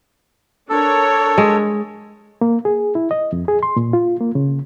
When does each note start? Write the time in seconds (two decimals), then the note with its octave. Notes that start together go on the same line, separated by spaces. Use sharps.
0.69 D4 A4 A#4 C#5
1.38 G#3
2.41 A#3
2.65 G#4
2.95 E4
3.11 D#5
3.32 F2
3.48 G#4
3.63 C6
3.76 A#2
3.93 F4
4.21 A#3
4.35 C#3